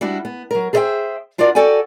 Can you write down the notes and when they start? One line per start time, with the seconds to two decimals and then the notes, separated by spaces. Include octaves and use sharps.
0.01 G3 D4 E4 F#4
0.25 B3
0.51 F#3 A#4
0.73 G#4 A4 C5 D#5 E5 G5
1.38 D4 F4 F#4 A#4 D5
1.55 F#4 A4 D5 G5 G#5